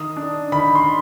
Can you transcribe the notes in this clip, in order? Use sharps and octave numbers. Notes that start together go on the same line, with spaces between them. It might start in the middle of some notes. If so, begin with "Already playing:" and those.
Already playing: D#3 D#6
D4
D#3 B5
C6